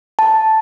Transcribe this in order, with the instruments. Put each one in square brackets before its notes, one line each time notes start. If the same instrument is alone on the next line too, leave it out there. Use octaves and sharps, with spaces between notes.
[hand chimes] A5